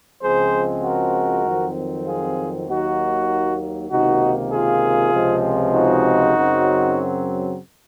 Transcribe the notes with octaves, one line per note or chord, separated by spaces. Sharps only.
C#2 C#3 F3 G#3 C4 G#4 C5
F#4 A#4
F2 D#3 F#3 C4
F4 G#4
D#2 D#3 F#3 A#3 D#4 F#4
C#2 C3 D#3 A#3 D#4 F#4
F4 G#4
C#2 C3 F3 G#3 C4
D#4 F#4
F#2 C#3 F#3 C4